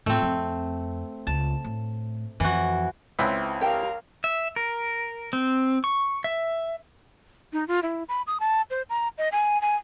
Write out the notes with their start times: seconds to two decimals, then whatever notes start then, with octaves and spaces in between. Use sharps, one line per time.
0.06 A2 A3 C4 F4
0.22 F2
1.27 C#2 A5
1.64 A2
2.40 F2 E3 F#4
3.19 C#2 C4 E4 B4
3.61 G4 A#4 F5 G5 A5
4.24 E5
4.56 A#4
5.33 C4
5.84 C#6
6.24 E5
7.53 D#4
7.68 F4
7.83 E4
8.09 B5
8.27 D#6
8.40 A5
8.70 C5
8.89 A#5
9.18 D#5
9.32 G#5
9.62 G#5